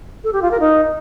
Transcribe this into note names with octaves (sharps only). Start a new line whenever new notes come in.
A4
G4
F4
A#4
D#4